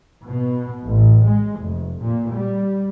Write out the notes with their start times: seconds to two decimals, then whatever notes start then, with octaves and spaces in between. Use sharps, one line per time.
0.26 B2
0.84 A1
1.26 G#3
1.59 F1
2.01 A#2
2.32 G3